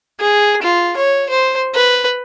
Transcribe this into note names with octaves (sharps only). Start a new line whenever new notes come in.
G#4
F4
C#5
C5
B4